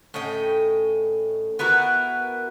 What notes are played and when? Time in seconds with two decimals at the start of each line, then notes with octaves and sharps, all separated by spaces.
0.14 A2 C#4 D#5 G5
1.59 B3 E4 F#4 A#4